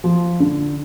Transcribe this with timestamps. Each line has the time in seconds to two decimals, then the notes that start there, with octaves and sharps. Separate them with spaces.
0.04 F3
0.40 D3